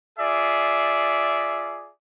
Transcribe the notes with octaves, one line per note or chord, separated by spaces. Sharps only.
F4 G#4 D5 E5